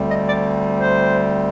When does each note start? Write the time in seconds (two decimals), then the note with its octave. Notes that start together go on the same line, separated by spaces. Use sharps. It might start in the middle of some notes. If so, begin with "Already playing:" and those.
Already playing: D2 D3 G3 C4
0.09 D#5
0.27 D5
0.80 C5